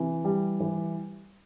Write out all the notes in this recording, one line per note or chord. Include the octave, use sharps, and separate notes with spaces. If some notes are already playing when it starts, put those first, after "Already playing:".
Already playing: C3 E3
G3
E3